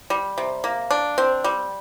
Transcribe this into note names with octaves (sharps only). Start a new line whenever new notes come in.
G3
C3
A#3
D4
C4
G3